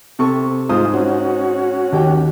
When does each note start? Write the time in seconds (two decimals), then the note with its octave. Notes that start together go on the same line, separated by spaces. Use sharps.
0.19 C3 A4 C#6
0.69 G#2 G#3 F4 C5 D#6
0.94 C#4 F#4
1.92 D#2 G4 G5